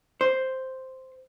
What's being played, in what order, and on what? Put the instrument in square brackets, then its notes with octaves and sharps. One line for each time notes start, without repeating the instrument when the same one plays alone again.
[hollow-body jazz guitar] C5